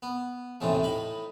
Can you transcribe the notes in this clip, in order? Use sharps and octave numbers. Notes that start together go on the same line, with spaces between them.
B3
A1 D#2 A2 C3 E3 A3
A2 D#4 B5